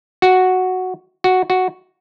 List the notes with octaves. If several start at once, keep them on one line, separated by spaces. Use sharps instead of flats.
F#4
F#4
F#4